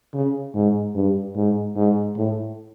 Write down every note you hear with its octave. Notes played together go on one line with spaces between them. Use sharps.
C#3
G#2
G2
G#2
G#2
A2